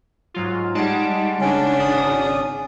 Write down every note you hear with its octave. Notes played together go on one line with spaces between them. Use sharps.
G#2 F#3 F4
G3 G#3 D#4 F#5 A5 D7
C#3 C#4 D4
G#1 D5 D#6